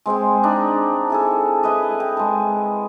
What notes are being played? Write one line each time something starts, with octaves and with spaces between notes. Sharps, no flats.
G#3 C4 G#4 G5
D4 D#4
E4 G#4 A4
E4 B4 D#5
G5
G#3 A5